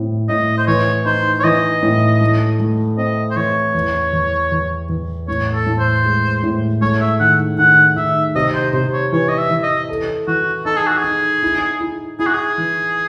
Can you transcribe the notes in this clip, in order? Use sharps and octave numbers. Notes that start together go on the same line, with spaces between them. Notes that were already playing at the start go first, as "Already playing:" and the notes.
Already playing: A2 C4
A2 D#5
C5
E3 C#5
D#4 C5
C#5
E3 D#5
A2
A3
A3
C4 D#5
C5
E3 C#5
E2
E2
E2
E2
A2 C#5
A4
A2
C5
G#3
A2
A3 C#5
E5
D#3 F#5
D#3 F#5
D#3 E5
C3 D#5
C5
C3 C5
C#5
E3 C#5
D#5
E5
E3
D#5
A4
E3 F#4
D#4 A4
G#4
F#4
G#4
D#4
E4
E4
E4 G#4
F#4
G#4
E3